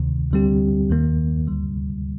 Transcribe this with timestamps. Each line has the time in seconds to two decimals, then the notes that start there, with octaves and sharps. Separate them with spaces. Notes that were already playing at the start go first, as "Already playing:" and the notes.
Already playing: D2 C3 D#3
0.31 D2 D3 G3 C4 G4
0.90 D#2 D#3 A#3
1.47 D2 D3 G3